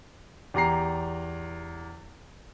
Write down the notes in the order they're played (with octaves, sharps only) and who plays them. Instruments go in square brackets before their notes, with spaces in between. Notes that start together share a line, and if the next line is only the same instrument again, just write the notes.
[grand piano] E2 G4 A#5 C7